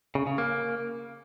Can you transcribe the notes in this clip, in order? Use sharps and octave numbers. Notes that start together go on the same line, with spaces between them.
C#3
C#3
A#3